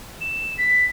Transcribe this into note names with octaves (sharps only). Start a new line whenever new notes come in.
E7
B6